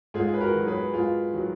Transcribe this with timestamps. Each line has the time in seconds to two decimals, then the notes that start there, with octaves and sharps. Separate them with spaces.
0.14 G#2 F4 G#4
0.34 B4
0.41 F#4 A#4
0.54 D#3 F#3
0.67 G#4 B4
0.93 G#2 F4 G#4
1.33 D#3 F#3